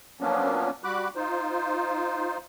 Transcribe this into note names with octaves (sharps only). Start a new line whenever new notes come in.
F3 F#3 A#3 B3 C#4 D4
G3 F#4 B5 D6 F#6
D#4 F4 C5